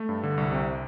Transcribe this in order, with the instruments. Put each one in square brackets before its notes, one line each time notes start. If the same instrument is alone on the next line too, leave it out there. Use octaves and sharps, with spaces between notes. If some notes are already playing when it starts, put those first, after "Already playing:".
Already playing: [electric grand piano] A3
G2
D3
C2
C3